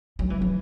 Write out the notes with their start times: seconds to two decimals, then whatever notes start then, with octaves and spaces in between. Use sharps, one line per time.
0.19 F#3
0.30 E3
0.42 E3